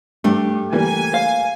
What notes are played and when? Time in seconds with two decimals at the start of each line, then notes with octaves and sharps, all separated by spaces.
0.24 G2 A3 G4
0.73 E3 G3 A#3 G#5
1.14 F5